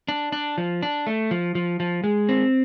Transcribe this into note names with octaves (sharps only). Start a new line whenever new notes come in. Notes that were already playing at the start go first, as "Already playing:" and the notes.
D4
D4
F3
D4
A3
F3
F3
F3
G#3
C4